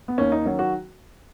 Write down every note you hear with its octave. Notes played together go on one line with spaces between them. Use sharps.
B3
D#2 C#4
D#4
D#3 F#3 C#4
F#4